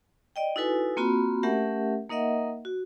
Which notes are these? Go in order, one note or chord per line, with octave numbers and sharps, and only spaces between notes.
D5 D#5 G5
D#4 E4 F#4 A4 B4 G#5
A#3 C4 F4 F#4 B5
A3 C#4 G4 A#4 E5 F#5
A#3 D#4 A#4 D#5 E5 F#5
F#4